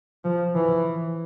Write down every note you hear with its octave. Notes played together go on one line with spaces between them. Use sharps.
F3
E3